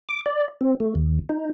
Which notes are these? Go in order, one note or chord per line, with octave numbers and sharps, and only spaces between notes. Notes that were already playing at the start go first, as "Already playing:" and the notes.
D6
D5
C4
A3
D#2
D#4